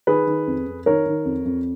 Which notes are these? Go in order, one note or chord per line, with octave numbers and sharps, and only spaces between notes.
D#3 G#4 B4
D#3
F2
F2
D#3 A#4 C#5
D#3
F2
F2